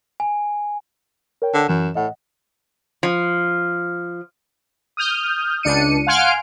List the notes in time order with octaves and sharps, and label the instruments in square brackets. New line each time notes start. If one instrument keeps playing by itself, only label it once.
[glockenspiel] G#5
[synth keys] A#4 C#5 G5
[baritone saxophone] D3
[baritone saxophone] F#2 [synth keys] E3 E7
[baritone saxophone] A2 [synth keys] D#5 F#5
[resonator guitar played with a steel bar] F3
[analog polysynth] D#6 F6 G6
C#2 D4 C#7 D#7
F5 F#5 G#5 C6 F6 D7